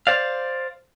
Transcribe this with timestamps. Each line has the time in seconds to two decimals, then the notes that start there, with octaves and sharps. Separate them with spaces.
0.07 C5 D5 F5